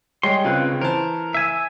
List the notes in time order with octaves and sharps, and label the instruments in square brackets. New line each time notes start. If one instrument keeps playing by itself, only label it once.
[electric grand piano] G3 G#3 [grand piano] C#5 D#5 G5 [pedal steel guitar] C6
[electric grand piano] C#2 C4 F4 [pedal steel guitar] C#3 B4 F#6
[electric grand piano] E3 [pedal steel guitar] A#4 [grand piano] C5 A5
[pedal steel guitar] E5 G#5 E6